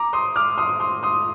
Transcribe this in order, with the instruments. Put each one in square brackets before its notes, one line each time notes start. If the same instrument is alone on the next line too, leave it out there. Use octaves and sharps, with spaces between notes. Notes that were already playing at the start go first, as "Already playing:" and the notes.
Already playing: [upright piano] A#5 D6
C6 D#6
D6 F6
C6 D#6
C6 D#6
C6 D#6